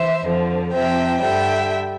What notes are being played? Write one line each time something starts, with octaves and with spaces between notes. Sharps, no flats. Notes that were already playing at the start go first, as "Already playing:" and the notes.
Already playing: E3 C5 E5
F2 D3 F3
F2 C3 F3 E5 G5
G2 D3 G3 E5 G5